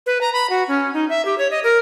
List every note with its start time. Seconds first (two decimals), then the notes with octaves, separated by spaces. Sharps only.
0.06 B4
0.21 A#5
0.33 B5
0.50 F#4
0.68 C#4
0.94 D#4
1.09 E5
1.25 G4
1.38 C#5
1.51 D#5
1.64 A#4